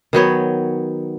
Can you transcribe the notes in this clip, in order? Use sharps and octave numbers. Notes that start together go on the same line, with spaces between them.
D#3 F#3 B3 C#5